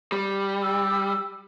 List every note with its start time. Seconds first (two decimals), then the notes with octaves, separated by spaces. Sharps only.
0.12 G3
0.63 E6